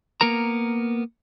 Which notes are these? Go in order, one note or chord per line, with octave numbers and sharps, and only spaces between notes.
A#3 B3 A#4 A#5